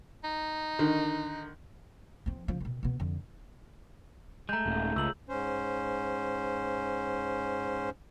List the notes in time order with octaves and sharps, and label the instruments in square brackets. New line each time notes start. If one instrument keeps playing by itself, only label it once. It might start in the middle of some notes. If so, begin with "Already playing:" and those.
[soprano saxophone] D#4
[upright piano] D3 D#3
[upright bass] F3 C4
C#2 F3
B2 D#3
B2 B3
F2 D3
[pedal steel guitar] G#3 A3 [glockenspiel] A#5 G6
[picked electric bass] D#1
[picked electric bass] C#2 [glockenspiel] E6 F#7
[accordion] G#2 C#4 C5